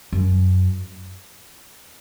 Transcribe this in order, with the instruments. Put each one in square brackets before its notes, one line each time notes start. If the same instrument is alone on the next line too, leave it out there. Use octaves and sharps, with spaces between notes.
[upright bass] F#2